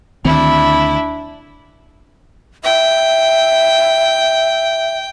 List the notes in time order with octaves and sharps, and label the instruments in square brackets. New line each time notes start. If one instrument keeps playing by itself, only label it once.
[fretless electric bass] D2 D#3 C4 [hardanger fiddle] D4 E4
[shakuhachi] E5 [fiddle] G5